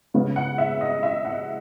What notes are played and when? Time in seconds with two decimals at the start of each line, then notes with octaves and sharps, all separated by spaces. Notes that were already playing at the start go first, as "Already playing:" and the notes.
0.14 C#3 G#3 B3
0.36 F#5
0.58 E5
0.81 D#5
1.03 E5
1.25 F#5